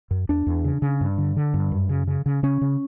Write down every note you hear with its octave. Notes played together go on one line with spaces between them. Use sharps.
F#2
E2 D4
E2
C#3
C#3
G2
D3
D3
G2
F#2
C#3
C#3
C#3
C#3 C#4
C#3